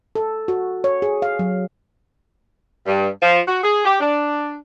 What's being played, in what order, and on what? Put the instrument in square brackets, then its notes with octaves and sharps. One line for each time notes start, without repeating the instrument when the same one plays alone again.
[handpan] A4
F#4
C#5
G#4
F5
F#3
[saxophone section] G2
F3
F#4
G#4
G4
D4